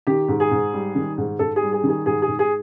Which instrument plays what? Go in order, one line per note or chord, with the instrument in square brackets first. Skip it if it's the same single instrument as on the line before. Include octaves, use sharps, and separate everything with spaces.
[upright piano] D#3 G4
G#2
G#4
G#2
G3
D#3
G#2
G#2 A4
G#4
G3
G#4
D#3
G#4
G#2 G#4
G#4
G#2
G#4